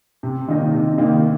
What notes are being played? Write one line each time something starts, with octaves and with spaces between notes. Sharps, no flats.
C3
D#3 A#3 D#4
C3
D#3 A#3 D#4